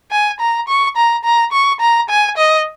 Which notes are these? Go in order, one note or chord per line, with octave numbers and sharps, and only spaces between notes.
G#5
A#5
C#6
A#5
A#5
C#6
A#5
G#5
D#5